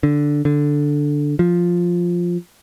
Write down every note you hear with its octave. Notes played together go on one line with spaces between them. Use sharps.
D3
D3
F3